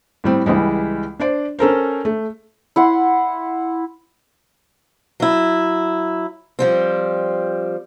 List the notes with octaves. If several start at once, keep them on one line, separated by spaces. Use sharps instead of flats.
A2 G3 C4
C#2 E3 G3 G#3
D4 C5 D5
C#4 A4 A#4 C5
A3
E4 F#5 C6
F#3 E4
F3 G3 C4